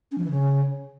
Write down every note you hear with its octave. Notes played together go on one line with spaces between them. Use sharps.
C#4
F3
E3
C#3